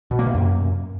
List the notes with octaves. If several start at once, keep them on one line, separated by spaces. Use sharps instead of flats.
B2
A#3
C3
F#2